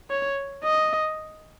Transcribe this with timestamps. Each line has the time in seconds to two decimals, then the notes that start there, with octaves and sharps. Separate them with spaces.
0.10 C#5
0.64 D#5